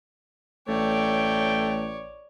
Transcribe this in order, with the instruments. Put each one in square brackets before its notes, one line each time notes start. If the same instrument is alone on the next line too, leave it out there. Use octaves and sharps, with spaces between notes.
[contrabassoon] A1 [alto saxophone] A3 [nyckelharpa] C#5 D5 [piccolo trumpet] G5